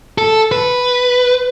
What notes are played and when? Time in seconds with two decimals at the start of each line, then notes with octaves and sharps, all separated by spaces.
0.18 A4
0.52 B4